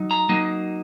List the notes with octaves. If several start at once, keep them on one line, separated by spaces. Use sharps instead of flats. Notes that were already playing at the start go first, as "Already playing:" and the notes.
Already playing: F#3 D#4
A#5
F#3 A#3 D#4